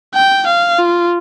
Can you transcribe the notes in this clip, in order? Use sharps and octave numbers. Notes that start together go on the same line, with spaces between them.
G5
F5
F4